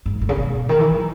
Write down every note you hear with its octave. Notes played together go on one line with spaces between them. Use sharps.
G#2
A2
C#3
B2
D#3
E3
F#3